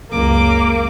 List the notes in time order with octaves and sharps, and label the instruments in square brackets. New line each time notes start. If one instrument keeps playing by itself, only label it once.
[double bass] F#1 C#2 [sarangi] A#3 [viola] D6